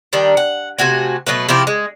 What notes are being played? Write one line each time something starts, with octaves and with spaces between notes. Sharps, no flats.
D#3 G3 D4
F#5
C3 A3 F#4 G#5
B2 F#3 A3 B4
C3 F3 E4 G4
G#3